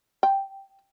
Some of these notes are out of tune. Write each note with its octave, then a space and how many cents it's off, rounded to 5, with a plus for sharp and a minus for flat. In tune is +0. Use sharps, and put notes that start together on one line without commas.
G5 -5